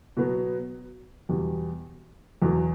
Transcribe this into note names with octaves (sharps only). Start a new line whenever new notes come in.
B2 F#3 B3
E2 B2 G3
E2 B2 F#3